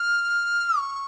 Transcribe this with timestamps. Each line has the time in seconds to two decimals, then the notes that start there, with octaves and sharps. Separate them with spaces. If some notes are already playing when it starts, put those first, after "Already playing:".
Already playing: F6
0.78 C#6